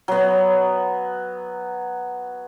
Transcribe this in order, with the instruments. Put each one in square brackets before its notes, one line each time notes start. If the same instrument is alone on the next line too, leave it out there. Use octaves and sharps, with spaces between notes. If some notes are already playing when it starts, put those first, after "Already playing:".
[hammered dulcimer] F#3 B3